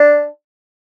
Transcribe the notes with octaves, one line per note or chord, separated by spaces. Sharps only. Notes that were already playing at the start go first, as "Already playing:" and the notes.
Already playing: D4